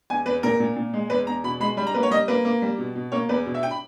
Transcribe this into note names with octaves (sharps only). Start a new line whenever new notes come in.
E2 G#5
E2 B4
A#2 A#4
A#2
A#2
G#3
E2 B4
E2 A#5
B2 B5
G#3 B5
G3 B5
A#5
A#3 B4
C#5
G3 D#5
A#3 B4
A#3
G3
B2
B2
A#3 C#5
E2 B4
B2
E5
G5
B5